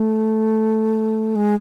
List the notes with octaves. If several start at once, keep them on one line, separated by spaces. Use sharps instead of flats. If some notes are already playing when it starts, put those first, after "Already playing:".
Already playing: A3
G#3